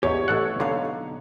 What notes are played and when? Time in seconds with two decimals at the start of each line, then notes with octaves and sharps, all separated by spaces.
0.03 E2 G4 C#5 D#5
0.28 A1 A4 F#5
0.60 B1 D3 D#4 F5